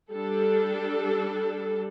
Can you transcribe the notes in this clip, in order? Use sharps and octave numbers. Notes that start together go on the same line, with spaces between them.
G3 D4 A4